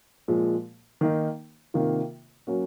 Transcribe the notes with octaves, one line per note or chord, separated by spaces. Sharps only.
A#2 F3 G#3
D#3 A#3 D#4
C3 D#3 A#3 F4
F#3 A#3 C#4 F#4